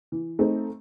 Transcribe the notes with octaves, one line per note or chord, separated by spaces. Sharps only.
E3
A3 C4 D#4